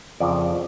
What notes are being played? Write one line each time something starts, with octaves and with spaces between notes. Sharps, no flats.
F2 C#3 F3 D5